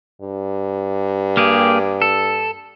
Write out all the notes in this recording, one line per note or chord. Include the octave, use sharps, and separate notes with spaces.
G2
A#3 G4 G#4
A4